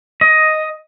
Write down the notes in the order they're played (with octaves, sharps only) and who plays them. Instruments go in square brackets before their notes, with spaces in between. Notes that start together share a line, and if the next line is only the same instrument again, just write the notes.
[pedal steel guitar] D#5